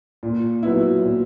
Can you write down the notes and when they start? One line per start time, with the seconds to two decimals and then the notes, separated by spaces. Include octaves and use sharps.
0.23 A#2
0.63 F#3 B3 E4
1.03 A#2